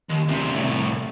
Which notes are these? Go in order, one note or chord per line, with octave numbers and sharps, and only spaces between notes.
D#2
D2 C3
C2 A2